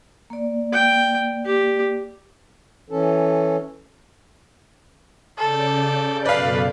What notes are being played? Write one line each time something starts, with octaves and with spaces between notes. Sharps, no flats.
A#3 D5
G5
G4
E3 C#4 A4
C#3 A4 D5 G6
F#2 B2 A4 B4 D5 F5